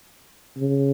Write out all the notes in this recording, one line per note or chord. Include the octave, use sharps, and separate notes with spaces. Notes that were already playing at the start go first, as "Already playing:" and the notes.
C#3